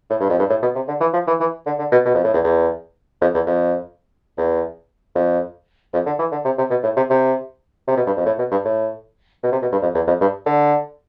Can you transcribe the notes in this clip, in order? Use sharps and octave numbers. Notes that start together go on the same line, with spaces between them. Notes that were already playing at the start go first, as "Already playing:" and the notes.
A2
G2
F2
G2
A2
B2
C3
D3
E3
F3
E3
E3
D3
D3
B2
B2
F2
A2
E2
E2
F2
E2
F2
E2
F2
F2
D3
E3
D3
C3
C3
B2
A2
C3
C3
C3
B2
G2
F2
A2
B2
G2
A2
B2
C3
B2
G2
F2
E2
F2
G2
D3